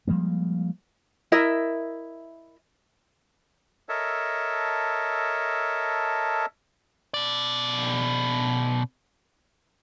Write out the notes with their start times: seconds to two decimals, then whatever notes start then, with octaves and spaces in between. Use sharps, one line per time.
0.08 F3 G3 G#3 A#3
1.32 E4 A#4 D#5 E5
3.89 A4 A#4 C#5 D#5 E5 A5
7.14 B2 D5